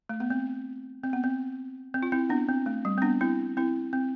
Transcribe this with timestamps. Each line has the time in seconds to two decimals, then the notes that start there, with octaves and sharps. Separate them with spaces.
0.09 A3
0.20 B3
0.30 C4
1.04 C4
1.13 B3
1.24 C4
1.94 C4
2.03 F4
2.12 C4 E4
2.29 B3 D4
2.49 C4
2.66 A3
2.85 G3
2.98 C4
3.02 B3 D4
3.21 C4 E4
3.57 C4 E4
3.93 C4